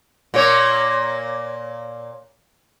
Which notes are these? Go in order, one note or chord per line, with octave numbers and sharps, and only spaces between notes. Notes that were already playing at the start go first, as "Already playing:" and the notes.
A#2 A#3 C#5